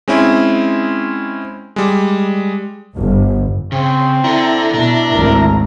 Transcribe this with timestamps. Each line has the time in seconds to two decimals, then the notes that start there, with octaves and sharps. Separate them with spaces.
0.08 G#3 C4 C#4 E4
1.76 G3 G#3
2.97 G1
3.72 C#3 C4
4.24 D4 E4 A4 A#5
4.74 B2 D4
5.13 G#1 D2 G#2 A#4